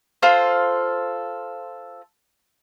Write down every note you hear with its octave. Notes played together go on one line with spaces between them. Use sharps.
F4 A4 C5